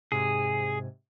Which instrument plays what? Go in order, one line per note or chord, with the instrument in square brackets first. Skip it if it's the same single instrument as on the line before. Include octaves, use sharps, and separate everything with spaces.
[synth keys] G#2 C3 G#5 [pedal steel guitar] G#4